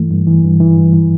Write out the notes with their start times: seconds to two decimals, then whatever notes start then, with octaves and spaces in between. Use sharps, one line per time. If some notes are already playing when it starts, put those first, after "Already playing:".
Already playing: G2 E3 A3
0.10 G2
0.27 E3
0.44 G2
0.60 E3
0.77 G2
0.93 E3